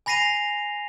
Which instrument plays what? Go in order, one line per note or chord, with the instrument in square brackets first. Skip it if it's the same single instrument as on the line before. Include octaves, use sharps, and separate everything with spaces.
[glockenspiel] G#5 B5 A#6 C7 D#7 F7